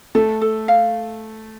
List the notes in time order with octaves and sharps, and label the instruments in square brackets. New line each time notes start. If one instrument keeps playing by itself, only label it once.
[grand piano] A3 [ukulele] A4
[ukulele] A4
F5